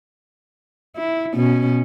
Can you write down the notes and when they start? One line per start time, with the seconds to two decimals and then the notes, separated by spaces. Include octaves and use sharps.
0.97 E4
1.34 B2 C#4